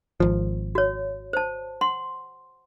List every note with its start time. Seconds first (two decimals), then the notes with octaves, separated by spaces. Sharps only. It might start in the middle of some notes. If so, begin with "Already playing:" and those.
0.20 G#1 F3
0.75 F#4 C#5
1.33 C5 A5
1.81 F#5 C6